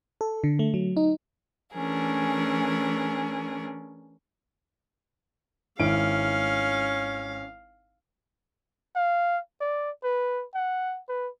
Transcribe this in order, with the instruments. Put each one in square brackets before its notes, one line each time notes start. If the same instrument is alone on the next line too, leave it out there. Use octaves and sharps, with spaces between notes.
[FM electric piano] A4
D3
A3
F#3
D#4
[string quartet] E3 A3 C#4 D4 G#4 A#4
[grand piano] G#1 E4 D7 [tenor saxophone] C#4 [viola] F5
[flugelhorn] F5
D5
B4
F#5
B4